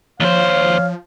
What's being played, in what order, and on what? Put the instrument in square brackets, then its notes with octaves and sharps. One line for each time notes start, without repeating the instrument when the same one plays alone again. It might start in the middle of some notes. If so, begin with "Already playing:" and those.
[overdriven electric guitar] D#2 C5 [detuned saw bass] F3 [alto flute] C#5 [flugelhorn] F5